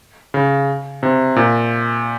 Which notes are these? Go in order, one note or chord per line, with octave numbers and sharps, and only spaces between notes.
C#3
C3
A#2